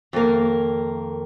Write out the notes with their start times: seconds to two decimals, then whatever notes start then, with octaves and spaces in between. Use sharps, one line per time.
0.13 F2 D#3 A#3